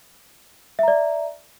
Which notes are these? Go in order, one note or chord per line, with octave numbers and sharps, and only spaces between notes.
D5 E5 A#5